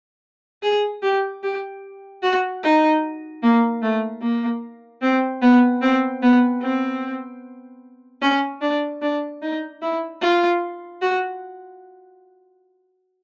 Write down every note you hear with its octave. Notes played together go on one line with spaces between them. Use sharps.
G#4
G4
G4
F#4
D#4
A#3
A3
A#3
C4
B3
C4
B3
C4
C#4
D4
D4
D#4
E4
F4
F#4